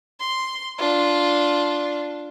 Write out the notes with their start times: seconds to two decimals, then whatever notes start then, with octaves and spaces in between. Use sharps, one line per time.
0.19 C6
0.78 D4 F4